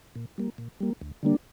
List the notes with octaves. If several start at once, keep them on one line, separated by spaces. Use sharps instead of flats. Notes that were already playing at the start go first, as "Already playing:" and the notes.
A#2
G3 A#3
A#2
G3 A#3
D2
D3 G3 A#3 D4